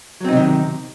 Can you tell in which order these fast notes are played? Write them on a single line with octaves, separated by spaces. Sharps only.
F#3 C4 D#4 C3 D#3